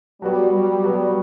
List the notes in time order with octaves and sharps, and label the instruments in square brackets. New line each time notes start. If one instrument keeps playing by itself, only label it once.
[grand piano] F#3 B3 F#4 [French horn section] G3
[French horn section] G3
[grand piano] F#3 B3 F#4 [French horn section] G3